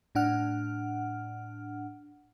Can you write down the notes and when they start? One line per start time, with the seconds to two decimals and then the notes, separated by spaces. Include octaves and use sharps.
0.15 A2 D4 F#5 F6